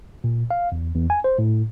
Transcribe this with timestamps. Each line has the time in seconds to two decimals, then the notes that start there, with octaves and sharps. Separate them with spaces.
0.24 A#2
0.51 F5
0.72 E2
0.95 E2
1.10 G#5
1.24 C5
1.39 A2